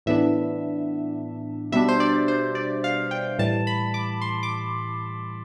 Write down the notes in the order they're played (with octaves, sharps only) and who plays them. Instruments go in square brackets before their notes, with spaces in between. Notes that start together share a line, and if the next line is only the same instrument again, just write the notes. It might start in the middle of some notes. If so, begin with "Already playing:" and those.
[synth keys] A2 E3 B3 D4 E5
B2 G3 B3 D4 E5
C5
D5
C5
D5
F5
G5
A2 E3 G3 A5
B5
D6
C6
D6